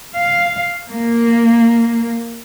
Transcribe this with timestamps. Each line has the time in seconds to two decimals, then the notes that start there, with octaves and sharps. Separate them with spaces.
0.14 F5
0.90 A#3